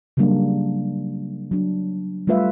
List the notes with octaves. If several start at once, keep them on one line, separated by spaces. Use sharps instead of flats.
C#3 F#3 G3 A#3 D4
F#3 D4
G3 A3 F4 B4 E5 F5